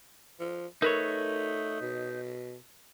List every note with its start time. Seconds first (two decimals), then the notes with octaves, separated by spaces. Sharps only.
0.40 F3
0.82 A3 D#4 A#4 B4 C#5
1.81 B2